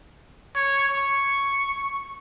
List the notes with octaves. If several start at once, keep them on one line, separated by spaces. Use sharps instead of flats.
C#5
C#6